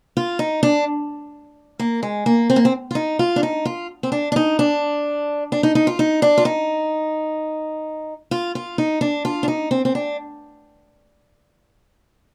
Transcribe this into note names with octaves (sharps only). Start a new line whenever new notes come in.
F4
D#4
D4
A#3
G#3
A#3
C4
A#3
C4
F4
D#4
F4
D4
D#4
F4
C4
D4
D4
D#4
D4
D4
D#4
D#4
F4
D#4
D4
F4
D#4
F4
F4
D#4
D4
F4
D4
D#4
C4
C4
D4